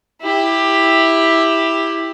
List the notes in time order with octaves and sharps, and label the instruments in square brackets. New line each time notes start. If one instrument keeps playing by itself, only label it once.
[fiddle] E4 G4